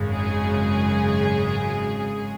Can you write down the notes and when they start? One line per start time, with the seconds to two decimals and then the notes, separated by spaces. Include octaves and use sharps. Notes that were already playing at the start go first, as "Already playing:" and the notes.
Already playing: G#1 F#2 C#3 G#3
0.10 G#4